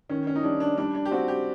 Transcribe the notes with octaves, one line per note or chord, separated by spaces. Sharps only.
D#3 C#4
C#4
D#4
G3 D4
D4
G3 D4
D4
G4
C4 F#4
G4